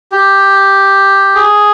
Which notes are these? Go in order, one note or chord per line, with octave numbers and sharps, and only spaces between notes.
G4
G#4